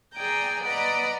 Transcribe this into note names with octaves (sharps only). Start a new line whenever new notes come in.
G#4 D5 G5 G#5 A#5
B4 D5 D#5 F#5 A#5 B5